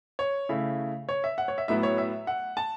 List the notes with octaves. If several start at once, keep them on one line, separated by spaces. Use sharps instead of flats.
C#5
C#3 A3 E4
C#5
E5
F#5
C#5
E5
A2 F#3 B3 E4 E5
C#5
E5
F#5
A5